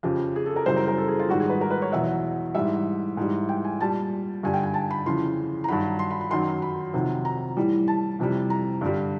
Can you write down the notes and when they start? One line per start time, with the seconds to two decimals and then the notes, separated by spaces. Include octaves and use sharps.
0.03 F2 C#3 F3 G4
0.36 G#4
0.46 A4
0.56 A#4
0.66 F#2 C#3 E3 G3 C5
0.76 A#4
0.88 A#4
0.98 A4
1.08 G#4
1.19 F4
1.29 G#2 D#3 G3 F#4
1.40 G#4
1.50 B4
1.61 A#4
1.71 B4
1.82 C#5
1.92 E2 B2 F#3 E5
2.55 G#2 E3 G3 E5
3.17 G#2 E3 G3
3.49 G5
3.64 G#5
3.80 A#2 G3 A5
4.43 G2 D3 G3 G#5
4.54 G5
4.63 G#5
4.74 A5
4.90 B5
5.05 F2 C#3 E3 C6
5.64 A#5
5.68 G2 D#3 F#3 B5
5.99 C6
6.10 B5
6.21 B5
6.30 F#2 D#3 F#3 C6
6.62 B5
6.93 F2 C3 D#3 F#3
7.25 A#5
7.57 A2 E3 G3
7.88 A5
8.19 F2 C3 E3 G3
8.50 A#5
8.81 G2 D3 G3